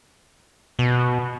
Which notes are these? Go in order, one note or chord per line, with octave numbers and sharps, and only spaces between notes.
B2